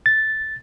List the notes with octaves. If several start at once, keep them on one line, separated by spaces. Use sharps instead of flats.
A6